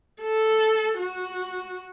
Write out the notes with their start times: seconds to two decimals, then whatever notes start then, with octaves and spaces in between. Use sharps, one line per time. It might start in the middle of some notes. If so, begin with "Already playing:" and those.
0.21 A4
0.98 F#4